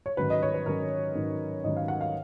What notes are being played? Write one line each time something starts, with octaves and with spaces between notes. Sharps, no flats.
C#5
G#2 D#3 F#3 C#4 B4
D#5
C#5
B4
G#2 D#3 F#3 C#4 A#4
G#2 D#3 F#3 C#4
G#2 D#3 F#3 C#4 D#5
F5
F#5
F5